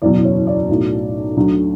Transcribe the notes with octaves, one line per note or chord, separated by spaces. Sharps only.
F#1 E2 B2 F#3 D5
C#5
D5
B1 A2 F#3
D2 D3 F#3